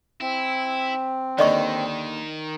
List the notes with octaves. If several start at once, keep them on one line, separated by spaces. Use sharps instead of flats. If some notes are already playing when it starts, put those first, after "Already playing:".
C4 E4
D#2 D3 D#3 D5 D#5 C#6